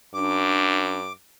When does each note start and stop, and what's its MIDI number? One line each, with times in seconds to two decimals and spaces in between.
0.14 1.10 42
0.14 0.97 62
0.14 1.13 86